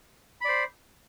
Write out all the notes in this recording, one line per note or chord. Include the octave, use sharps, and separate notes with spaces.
C5 D5 B5